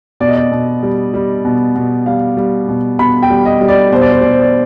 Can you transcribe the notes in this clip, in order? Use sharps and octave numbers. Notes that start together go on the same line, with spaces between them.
B2 D5
D#5
D5
B2
G3
G3
B2
B2
G3 F5
G3
B2
B2 B5
G5
G3
D#5
G3
D5
B2 C5
D5
C5
B2 D5
C5
D5